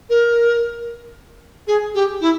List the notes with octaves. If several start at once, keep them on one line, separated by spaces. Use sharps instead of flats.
A#4
G#4
G4
E4